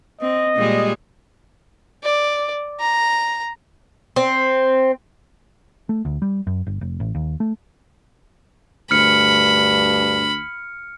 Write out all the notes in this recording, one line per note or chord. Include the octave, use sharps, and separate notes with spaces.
C4 D#5
A#2 G3 G#3
D5
A#5
C4
A3
D2
G3
F#2
G1
F1
A1
D#2
A3
D2 G2 B5 F6 C#7